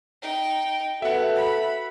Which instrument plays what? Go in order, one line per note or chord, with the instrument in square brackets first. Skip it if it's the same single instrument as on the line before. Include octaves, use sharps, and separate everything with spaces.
[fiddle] D#4 G5
[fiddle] B3 [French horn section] F#4 A4 [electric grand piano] E5 F#5
[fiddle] B5